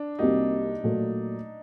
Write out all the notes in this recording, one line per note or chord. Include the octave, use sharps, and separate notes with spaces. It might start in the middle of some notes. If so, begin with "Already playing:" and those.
Already playing: D4
C2 C3 G3 A#3 D#4 F#4
A#2 F#3 A3